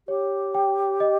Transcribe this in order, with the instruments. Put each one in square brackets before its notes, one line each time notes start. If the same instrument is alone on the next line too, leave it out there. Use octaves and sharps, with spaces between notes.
[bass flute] G4 [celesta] C#5
[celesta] G5
D#5